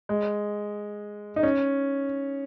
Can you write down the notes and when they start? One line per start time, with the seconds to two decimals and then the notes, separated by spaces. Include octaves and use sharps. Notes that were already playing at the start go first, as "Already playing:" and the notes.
0.09 G#3
1.36 D#4
1.43 C#4